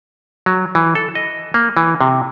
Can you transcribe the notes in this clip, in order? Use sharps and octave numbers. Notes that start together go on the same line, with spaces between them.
F#3
E3
A4
D#5
A#3
E3
C3